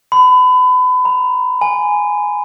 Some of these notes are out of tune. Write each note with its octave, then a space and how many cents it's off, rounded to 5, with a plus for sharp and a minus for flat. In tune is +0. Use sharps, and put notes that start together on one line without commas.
B5 +30
A#5 +35
G#5 +5